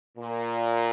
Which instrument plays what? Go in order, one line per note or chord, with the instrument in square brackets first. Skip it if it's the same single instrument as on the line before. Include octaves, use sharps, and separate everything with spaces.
[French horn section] A#2